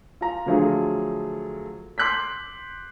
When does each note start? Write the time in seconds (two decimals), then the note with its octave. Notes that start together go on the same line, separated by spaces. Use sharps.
0.21 F4 A#5
0.46 D3 F3 F#3 A3 F4 G#4
1.98 C6 D6 F#6 G6 B6